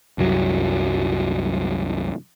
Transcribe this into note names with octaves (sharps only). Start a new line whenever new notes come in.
C2 F#2 F#3